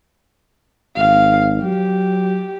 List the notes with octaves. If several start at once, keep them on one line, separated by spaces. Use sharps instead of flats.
G#1 F5
F#3 G4